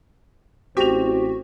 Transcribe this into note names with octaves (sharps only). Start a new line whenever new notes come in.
A1 C4 F#4 G4 F7